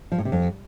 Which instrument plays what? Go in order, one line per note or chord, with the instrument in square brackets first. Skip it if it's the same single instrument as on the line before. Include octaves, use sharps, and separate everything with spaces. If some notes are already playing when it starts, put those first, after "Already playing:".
[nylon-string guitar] F3
A2
C3
F2